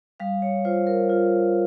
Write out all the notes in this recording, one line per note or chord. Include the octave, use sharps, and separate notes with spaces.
G3 F5
C#5
F4 C5
A#4
F4